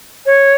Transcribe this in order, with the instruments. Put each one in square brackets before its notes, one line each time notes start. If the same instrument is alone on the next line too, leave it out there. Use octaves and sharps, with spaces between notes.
[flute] C#5